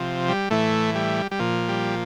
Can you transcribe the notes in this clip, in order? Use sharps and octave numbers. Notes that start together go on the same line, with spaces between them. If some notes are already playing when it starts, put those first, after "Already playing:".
Already playing: C3 F3
G3
A2 E3 A3
G3
G3
A#2 F3
G3